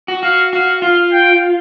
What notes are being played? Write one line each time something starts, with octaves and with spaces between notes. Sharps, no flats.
F#4
F#4 F5
F#4 F5
F4 F5
G5